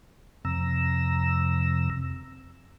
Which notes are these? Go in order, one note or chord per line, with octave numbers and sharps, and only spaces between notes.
F2 C3 A#5 E6